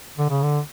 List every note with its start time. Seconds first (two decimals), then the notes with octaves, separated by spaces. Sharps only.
0.18 D3
0.30 C#3
0.43 D3